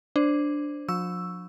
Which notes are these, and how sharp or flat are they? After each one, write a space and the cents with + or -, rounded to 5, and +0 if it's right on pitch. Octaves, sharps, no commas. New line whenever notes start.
D4 +0 C5 +0
F3 +45 C#6 +0 E6 +0